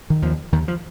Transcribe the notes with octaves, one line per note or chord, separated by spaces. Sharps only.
D#3
D#2 F3
D#2 D#3
F3